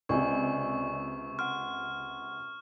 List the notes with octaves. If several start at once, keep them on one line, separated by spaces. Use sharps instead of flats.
C#2 C3 D5 D#5 G#5 C#6
F#5 C6 F6